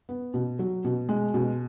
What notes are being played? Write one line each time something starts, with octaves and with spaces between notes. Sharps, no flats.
B3
B2
F#3
B2
G#3
B2